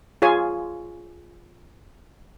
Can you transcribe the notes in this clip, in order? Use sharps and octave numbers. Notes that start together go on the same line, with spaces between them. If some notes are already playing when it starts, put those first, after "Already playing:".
F4 G#4 C#5 G#5